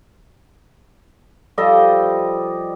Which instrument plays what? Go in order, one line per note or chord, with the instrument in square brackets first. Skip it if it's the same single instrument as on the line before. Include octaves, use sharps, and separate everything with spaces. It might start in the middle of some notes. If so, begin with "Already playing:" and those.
[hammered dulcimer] F3 G3 A4 D#5